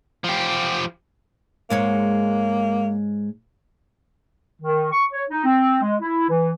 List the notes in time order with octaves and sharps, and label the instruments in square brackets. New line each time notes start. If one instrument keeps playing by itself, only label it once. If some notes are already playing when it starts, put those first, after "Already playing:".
[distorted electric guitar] F3 G4
[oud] G#2 G#3 C#5 [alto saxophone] A#3
[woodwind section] D#3
C#6
C#5
D#4
C4
G#3
E4
E3